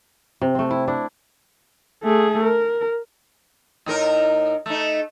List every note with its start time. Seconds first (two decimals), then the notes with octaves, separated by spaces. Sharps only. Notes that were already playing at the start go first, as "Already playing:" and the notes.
0.41 C3
0.55 A3 C4
0.71 E4
0.88 D4 E4
2.03 A3 G#4
2.45 A#4
3.86 A2 D#4 A#4
4.66 A3 D#4